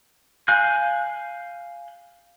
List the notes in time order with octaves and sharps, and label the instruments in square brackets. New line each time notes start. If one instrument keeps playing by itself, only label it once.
[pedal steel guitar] F5 G#5 F#6 G6